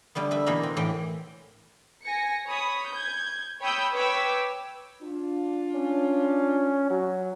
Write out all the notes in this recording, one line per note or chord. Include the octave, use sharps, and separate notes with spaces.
D3 G3 A3 B3
A3 B4 E5
B2 E3 A#3 B3 A#4 B5
C4
A2 E3 G4 G5
G#5 A#6 C#7
C#5 B5 D#6
G6 G#6
C#5 G5 B5 D#6 E6 G6
B4 C#5 G5 B5 D6 E6
D4 F4
C#4
F#3